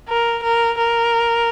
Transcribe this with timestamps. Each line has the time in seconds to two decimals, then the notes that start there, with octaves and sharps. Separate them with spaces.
0.09 A#4
0.43 A#4
0.78 A#4